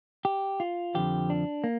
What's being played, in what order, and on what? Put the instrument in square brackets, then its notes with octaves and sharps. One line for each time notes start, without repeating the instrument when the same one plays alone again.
[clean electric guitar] G4
F4
F2 D3 F3 G4
D4
A#3